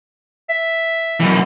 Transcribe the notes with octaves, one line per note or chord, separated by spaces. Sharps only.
E5
F#2 E3